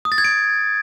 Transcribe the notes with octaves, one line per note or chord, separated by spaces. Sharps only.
D#6
A6
G#6
D7